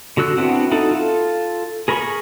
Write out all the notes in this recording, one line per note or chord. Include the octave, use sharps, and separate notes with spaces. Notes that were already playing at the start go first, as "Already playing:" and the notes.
D3 F#4 E6 F#6
B3 C4 D4 E4 F#4
D#4 E4 F#4 A4
F4 A4
G#4 A#4 B5 C#6